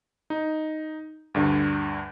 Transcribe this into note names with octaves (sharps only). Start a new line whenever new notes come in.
D#4
D2 G2 D3